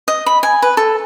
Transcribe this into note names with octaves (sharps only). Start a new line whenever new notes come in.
D#5
B5
G#5
B4
A4